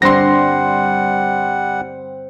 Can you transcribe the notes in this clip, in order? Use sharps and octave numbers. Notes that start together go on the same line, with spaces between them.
G2 D3 G3 C4 F#5 C6 A#6